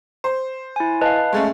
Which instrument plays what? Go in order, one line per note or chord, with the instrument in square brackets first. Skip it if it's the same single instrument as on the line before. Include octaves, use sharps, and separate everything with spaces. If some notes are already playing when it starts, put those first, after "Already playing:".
[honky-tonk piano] C5
[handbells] E4 G#5
[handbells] B4 F5 [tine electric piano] D#5 A5
[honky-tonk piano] G#3 A3 C#4